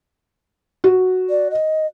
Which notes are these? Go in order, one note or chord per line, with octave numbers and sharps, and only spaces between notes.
F#4
D5
D#5